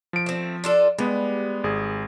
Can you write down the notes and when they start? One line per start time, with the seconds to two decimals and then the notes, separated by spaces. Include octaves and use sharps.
0.13 F3 D7
0.26 A3 C4
0.64 D4 F4 A4
0.98 G3 G#3 B3
1.64 G#1 G#4